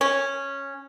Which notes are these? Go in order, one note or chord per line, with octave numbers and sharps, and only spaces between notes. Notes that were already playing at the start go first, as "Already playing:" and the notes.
C#4